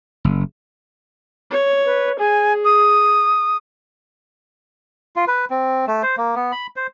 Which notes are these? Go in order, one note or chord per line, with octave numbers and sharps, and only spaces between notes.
F#1
C#5
B4
G#4 G#5
D#6
F4
B4
C4
A3
C5
A#3
B3
B5
C5